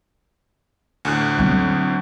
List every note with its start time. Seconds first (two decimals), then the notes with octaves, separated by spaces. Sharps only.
1.05 D2 A2 F#6
1.38 F#3 C4